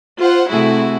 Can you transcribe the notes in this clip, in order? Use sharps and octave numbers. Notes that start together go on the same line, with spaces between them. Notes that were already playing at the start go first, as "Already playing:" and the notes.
F4 C5 F#5
C3 A3 E4 F#4 G#4